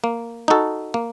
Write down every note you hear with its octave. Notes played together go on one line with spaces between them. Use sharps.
A#3
D#4 F#4 A4
A#3